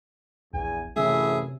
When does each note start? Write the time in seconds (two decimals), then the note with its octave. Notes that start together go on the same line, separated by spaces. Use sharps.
0.54 A#1 E2 G#5
0.96 F#2 A2 C3 E3 G#4 E5